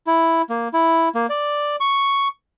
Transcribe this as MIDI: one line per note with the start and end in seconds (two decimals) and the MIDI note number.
0.07 0.42 64
0.50 0.68 58
0.73 1.09 64
1.15 1.26 58
1.29 1.76 74
1.80 2.28 85